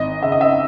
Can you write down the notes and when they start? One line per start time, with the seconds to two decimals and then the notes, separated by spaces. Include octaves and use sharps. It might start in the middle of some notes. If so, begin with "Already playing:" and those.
Already playing: G#1 D#5
0.22 C#3 E5
0.32 D#5
0.41 E5